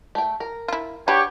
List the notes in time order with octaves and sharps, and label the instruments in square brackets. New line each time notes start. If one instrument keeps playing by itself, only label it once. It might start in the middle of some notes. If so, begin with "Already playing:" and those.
[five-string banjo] A3 G5
A#4
[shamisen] E4 F4
[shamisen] D4 B4 [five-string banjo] F#4 [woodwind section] G4 [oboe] C#5